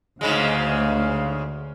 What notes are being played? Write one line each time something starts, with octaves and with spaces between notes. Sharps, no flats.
D2 G#2 C#3 G#3 F5